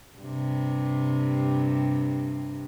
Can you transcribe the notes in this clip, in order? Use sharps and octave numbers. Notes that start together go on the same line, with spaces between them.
G2 C3